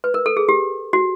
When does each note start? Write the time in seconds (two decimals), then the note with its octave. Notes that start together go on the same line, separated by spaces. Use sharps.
0.04 B4
0.14 A#4
0.26 A4
0.37 G#4
0.49 G4
0.93 F#4